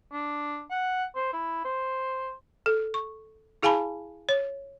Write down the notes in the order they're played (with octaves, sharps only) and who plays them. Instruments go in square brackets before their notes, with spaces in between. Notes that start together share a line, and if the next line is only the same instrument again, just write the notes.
[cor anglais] D4
F#5
C5
E4
C5
[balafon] A4
C#6
E4 G#4 F5 G#5 A5 B5
C#5